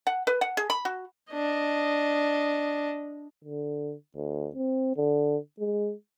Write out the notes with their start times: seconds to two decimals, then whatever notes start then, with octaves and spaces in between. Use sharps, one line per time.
0.07 F#5
0.27 B4
0.41 F#5
0.57 G#4
0.70 B5
0.85 F#4
1.33 D4 D#5
3.44 D3
4.15 D2
4.55 C4
4.97 D3
5.59 G#3